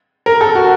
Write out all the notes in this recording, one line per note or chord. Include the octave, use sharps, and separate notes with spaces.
A#4
A4
F#4